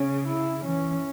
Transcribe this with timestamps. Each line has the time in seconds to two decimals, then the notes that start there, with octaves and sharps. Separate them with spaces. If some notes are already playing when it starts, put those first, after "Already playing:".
Already playing: C#3 C#4
0.29 E4
0.65 E3 C#4